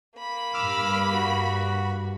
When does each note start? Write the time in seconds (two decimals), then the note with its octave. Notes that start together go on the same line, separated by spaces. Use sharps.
0.19 A#3 B5
0.54 G2 D6 E6 F6
1.13 F#4